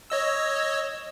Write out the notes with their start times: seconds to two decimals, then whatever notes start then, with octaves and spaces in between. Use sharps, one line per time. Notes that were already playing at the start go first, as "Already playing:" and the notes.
0.10 C#5 D#5 E6